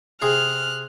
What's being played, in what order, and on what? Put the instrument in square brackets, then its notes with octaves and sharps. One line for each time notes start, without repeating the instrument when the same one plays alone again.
[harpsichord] C3 G#4 [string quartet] F6 F#6